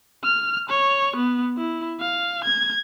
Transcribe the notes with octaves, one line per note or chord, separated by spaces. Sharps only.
F6
C#5
B3
E4
F5
G#6